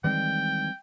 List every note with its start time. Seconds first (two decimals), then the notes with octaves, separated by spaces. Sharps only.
0.04 D#3 E3 G3 G#3 C4 G5